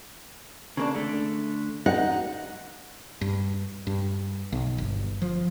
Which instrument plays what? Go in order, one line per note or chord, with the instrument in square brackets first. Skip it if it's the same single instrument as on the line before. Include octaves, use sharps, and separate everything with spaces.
[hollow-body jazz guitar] C#3 A#3 D4
D3 A3
[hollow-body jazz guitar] D#4 [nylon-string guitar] F#5
[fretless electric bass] G2
G2
B1
G1
F3